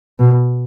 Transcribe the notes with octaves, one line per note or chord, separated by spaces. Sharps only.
B2